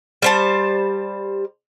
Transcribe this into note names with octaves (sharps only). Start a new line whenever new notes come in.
G3 C5 A5